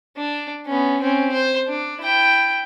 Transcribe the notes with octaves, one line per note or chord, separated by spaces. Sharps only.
D4
B3 C#4
C4 C#4
C5
D4
E4 G5